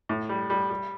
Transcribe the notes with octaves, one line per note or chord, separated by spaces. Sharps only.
A2
G3
G3
G3